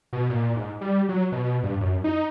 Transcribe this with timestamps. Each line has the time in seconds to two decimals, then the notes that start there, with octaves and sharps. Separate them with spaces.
0.13 B2
0.30 A#2
0.56 G#2
0.81 G3
1.09 F#3
1.32 B2
1.63 G2
1.81 F#2
2.04 D#4